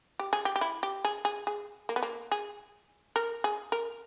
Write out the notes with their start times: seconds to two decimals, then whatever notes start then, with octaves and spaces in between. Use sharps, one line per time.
0.19 G4
0.33 G#4
0.45 G4
0.56 G4
0.61 E4
0.83 G4
1.05 G#4
1.25 G#4
1.47 G#4
1.89 A#3
1.96 B3
2.03 A#3
2.32 G#4
3.16 A#4
3.44 G#4
3.72 A#4